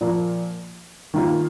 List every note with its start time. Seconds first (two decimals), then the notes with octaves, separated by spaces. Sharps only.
0.01 A#2 F3 A#3
1.14 D#3 A#3 F4